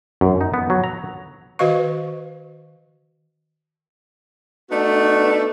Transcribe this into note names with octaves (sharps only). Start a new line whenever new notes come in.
F#2
D#4
B3
F#3
A#5
D#3 F#4 B4 D#5 F5 C#6
A3 B3 D4 D#4 F#4